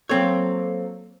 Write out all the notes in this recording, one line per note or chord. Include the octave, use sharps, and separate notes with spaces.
F#3 A#3 C4 A4 C#5